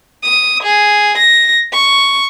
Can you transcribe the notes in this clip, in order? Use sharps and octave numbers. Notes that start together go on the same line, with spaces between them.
D#6
G#4
A#6
C#6